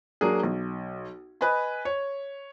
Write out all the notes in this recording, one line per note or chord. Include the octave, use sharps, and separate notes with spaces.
F#3 A#3 D4 G#4
B1
B4 D#5 G#5 B5
C#5